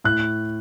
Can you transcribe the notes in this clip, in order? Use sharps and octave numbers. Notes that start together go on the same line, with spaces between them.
A2 F#6